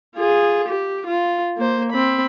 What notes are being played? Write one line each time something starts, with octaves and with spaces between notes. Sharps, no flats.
F4 G#4
G4
F4
A#3 C5
C4 B5